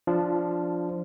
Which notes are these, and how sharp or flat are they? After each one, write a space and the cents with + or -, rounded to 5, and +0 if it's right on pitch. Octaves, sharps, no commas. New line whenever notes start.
F3 +0 D4 +0 F4 -25